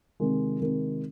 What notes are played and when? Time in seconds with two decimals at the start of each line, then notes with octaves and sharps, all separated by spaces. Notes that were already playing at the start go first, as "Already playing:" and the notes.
0.20 C3 D#3 G#3
0.60 C3 D#3 G#3